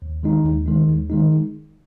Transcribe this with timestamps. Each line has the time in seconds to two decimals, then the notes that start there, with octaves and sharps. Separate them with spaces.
0.02 D#2
0.23 D#3 G#3 D#4
0.45 D#2
0.66 D#3 G#3 D#4
0.88 D#2
1.10 D#3 G#3 D#4